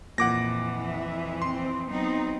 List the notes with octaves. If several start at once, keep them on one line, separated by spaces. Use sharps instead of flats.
F2 A#2 E3 F#5 D6 A#6
E5
C4 C6
F#3 B3 C4 D#4